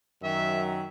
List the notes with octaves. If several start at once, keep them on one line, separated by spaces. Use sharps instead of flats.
F#2 D#3 F#3 E5